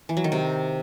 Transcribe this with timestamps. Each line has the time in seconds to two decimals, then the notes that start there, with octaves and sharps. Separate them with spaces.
0.09 E3
0.17 F#3
0.24 D#3
0.32 C3